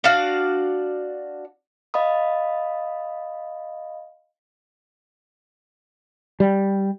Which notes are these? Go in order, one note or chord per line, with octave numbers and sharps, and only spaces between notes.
D4 F#4 D5 F5
D#5 F5 B5 D#6
G3